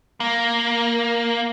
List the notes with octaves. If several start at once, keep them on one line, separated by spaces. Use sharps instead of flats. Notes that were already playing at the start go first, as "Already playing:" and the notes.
A#3